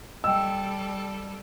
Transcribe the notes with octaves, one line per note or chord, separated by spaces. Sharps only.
G3 A4 D#5 G5 E6